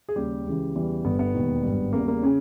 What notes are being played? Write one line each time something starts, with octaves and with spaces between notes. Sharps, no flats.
G#4
D#2 C#3 G3 G4
C#2 C#3 E3
E2 C#3 E3 G3
G1 G2 G3 B3
B3
E1 D#2 D#3 G3
G#1 G2 G3
E2 C#3 G3 A#3
A#3
C#3 C#4